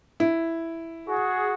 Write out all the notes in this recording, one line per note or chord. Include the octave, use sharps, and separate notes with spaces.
E4
F#4 G#4